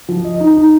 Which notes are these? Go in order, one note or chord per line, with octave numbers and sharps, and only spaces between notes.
F3
D#5
D#4
D#4